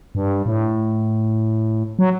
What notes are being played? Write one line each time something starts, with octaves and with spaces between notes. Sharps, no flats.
G2
A2
F#3